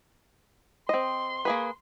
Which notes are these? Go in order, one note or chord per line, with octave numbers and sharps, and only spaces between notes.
C4 D#5 C6
A#3 G#4 B4